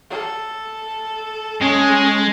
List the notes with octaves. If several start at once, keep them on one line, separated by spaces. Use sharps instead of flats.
A4
G#3 C#4